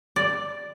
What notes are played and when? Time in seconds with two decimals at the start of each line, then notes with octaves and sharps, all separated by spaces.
0.16 D5